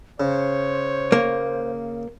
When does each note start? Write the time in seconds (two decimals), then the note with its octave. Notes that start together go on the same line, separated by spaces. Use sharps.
0.20 C#3 C5 C#5
1.12 A#3